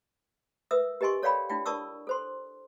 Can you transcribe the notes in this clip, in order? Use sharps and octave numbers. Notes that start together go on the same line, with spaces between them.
A#4 B4 E5 D#6 E6
G4 A#4 D#5 G#5 C6 C#6
A4 C#5 D5 F5 G5 B5
D4 E4 F4 G5
A#4 D5 A5 C#6 D#6 E6
A4 C5 C6